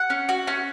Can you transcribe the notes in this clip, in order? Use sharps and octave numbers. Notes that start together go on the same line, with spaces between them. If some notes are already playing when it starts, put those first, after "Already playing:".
Already playing: F#5
C#4
F#4
C#4